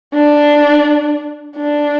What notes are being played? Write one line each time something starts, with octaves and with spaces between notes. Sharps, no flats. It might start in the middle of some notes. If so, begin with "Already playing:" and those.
D4
D4